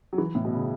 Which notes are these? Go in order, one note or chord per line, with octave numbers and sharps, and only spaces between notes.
F#3
E3
A2
B2
C#3